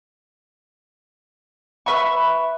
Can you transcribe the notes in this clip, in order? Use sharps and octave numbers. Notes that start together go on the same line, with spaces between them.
B4 E5 B5 C#6